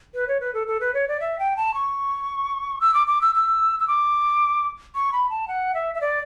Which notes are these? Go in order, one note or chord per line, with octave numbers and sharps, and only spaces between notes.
B4
C#5
B4
A4
A4
B4
C#5
D5
E5
G5
A5
C#6
E6
D6
D6
E6
E6
E6
D6
C#6
B5
A5
F#5
E5
E5
D5